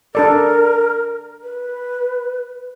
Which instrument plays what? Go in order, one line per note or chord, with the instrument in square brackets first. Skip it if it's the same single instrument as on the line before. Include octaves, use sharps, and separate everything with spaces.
[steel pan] D4 A4 D5 [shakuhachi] A#4
[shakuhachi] B4